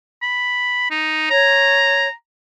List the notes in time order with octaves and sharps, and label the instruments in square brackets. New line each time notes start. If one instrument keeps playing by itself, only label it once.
[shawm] B5
D#4
[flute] C#5 [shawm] A#5